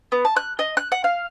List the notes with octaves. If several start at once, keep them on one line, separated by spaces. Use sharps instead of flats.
B3
A5
F#6
D#5
F#6
F#5
F5